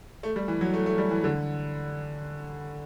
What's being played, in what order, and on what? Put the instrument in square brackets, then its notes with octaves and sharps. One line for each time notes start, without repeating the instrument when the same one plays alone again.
[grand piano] A3
G3
E3
F#3
A3
A3
G3
E3
D3